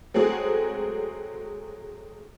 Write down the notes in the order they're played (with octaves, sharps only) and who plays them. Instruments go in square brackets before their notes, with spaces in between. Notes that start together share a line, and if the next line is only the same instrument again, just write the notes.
[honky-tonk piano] F#3 G#3 A3 C4 F#4 G#4